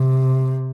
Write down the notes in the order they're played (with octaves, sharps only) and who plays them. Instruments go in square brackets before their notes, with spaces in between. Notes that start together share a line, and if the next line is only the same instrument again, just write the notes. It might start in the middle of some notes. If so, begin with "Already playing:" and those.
Already playing: [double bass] C3